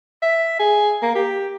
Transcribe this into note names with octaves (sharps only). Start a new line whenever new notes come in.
E5
G#4
A#3
G4